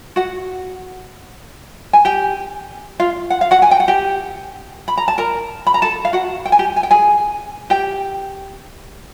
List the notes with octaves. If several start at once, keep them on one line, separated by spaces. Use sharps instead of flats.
F#4 F#5
G#5
G4 G5
F4 F5
F#5
F5
F#4 F#5
G#5
G5
F#5
G4 G5
B5
A#5
A5
A#4 A#5
B5
A#5
A4 A5
F5
F#4 F#5
G5
G#5
G4 G5
G#5
G5
G#4 G#5
G4 G5